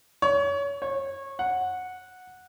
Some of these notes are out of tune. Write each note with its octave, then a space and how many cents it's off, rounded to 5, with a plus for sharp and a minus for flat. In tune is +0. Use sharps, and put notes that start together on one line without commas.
C#5 +25
C#5 -25
F#5 -10